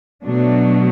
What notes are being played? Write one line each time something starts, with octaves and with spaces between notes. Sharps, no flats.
B2 F#3 A3 D4